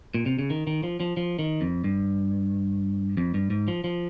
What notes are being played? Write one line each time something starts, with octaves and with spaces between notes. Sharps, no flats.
A#2
C3
C#3
D#3
D#3
F3
F3
F3
D#3
F2
G2
F2
G2
G#2
F3
F3